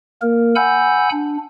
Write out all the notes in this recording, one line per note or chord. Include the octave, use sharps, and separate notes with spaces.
A#3 A#4
F#5 G#5 B5 E6 G6
D4